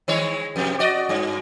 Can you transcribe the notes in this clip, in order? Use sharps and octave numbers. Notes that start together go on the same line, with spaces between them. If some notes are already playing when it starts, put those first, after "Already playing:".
D#3 G#3 C#5
F2 C3
F#4 D5 D#5
G2